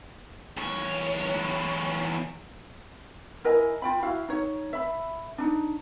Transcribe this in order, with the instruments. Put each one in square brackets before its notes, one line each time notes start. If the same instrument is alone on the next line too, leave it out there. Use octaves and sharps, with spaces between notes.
[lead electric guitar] E2 C#5
[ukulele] E4 A#4 D#5 G#5
F4 G5 B5
E4 F#4 F5 B5
D#4 C#5
E5 B5
D4 D#4